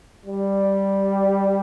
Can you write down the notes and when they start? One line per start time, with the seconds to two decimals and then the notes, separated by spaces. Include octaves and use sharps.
0.26 G3